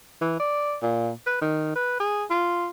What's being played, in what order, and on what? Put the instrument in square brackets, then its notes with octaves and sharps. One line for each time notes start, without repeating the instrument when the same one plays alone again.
[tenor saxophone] E3
D5
A#2
B4
D#3
B4
G#4
F4